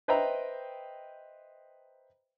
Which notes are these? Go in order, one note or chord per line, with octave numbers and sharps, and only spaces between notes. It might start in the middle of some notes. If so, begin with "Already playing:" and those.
B4 C5 D#5 E5 G5 A#5